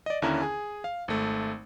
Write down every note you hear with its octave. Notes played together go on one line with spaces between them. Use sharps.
D5 D#5
D#2 D3 C#4 D4 E4 A#5
G#4 G#5
F5
G#1 A3